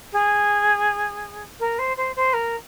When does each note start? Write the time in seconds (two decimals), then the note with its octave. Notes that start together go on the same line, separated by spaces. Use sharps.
0.12 G#4
1.59 A#4
1.78 C5
1.96 C5
2.15 C5
2.33 A#4